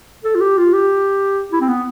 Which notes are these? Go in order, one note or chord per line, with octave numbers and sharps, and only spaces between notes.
A4
F4
G4
F4
G4
E4
C4
B3